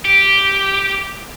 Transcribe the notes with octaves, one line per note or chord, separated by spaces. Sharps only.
G4